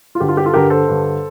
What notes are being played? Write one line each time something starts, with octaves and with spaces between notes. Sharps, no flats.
F4
G2 D3 G4
F4
G4
F4 A4
G2 D3 G4 A#4
A4 C5
G2 D3